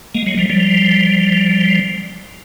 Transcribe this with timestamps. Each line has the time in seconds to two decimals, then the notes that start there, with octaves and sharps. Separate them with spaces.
0.15 G#3 A#3
0.26 F#3 G#3
0.38 F3 G3
0.50 F3 G3